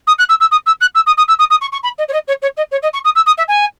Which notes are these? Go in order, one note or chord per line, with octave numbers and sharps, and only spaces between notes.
D#6
F#6
E6
E6
D#6
E6
F#6
E6
D#6
D#6
E6
D#6
D#6
C#6
C#6
B5
D#5
C#5
D#5
C#5
C#5
D#5
C#5
D#5
C#6
D#6
E6
D#6
E5
G#5